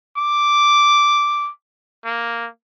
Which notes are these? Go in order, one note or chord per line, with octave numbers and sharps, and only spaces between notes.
D6
A#3